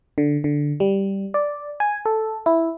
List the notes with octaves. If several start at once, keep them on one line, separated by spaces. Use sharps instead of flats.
D3
D3
G3
D5
G#5
A4
E4